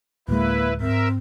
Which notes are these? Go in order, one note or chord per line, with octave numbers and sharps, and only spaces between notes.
D1 G#3 A#3 E4 B4
G#2 C4 A#4 E5